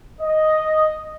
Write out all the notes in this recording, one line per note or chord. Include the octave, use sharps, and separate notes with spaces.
D#5